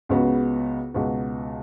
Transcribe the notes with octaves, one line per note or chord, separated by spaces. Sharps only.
C#2 C#3 B3 F#4
C#2 B2 B3 F#4